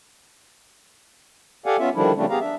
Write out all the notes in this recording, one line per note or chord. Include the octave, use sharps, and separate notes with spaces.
G4 A4 D5 F5 F#5 G#5
B3 C#4 F4 E5
D3 D#3 F3 G3 D4 E4
C#3 F3 G3 A3 C4 D4
B3 G4 G#4 F5 A#5
D4 E5